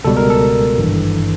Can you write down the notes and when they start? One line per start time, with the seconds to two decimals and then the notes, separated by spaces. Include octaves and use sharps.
0.05 C#2 B2 G3 A4
0.17 A#4
0.30 A4
0.78 G#1 G2 E3